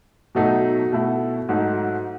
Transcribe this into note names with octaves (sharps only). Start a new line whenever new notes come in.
B2 F#3 A3 D#4
B2 A3 E4
G#2 F#3 A3 D#4